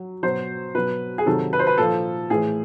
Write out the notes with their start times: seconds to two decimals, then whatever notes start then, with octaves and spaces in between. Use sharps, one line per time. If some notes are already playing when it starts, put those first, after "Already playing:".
Already playing: F#3
0.23 B2 F#3 C5
0.75 B2 F#3 B4
1.18 G#4
1.26 C3 D#3 F#3 A4
1.53 B4
1.59 C5
1.67 B4
1.78 A#2 F3 A4
2.30 A2 E3 G#4